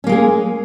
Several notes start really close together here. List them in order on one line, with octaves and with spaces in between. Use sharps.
C#4 A#3 G#3 G#4